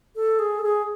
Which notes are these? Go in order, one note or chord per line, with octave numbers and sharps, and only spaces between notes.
A4
G#4
A4
G#4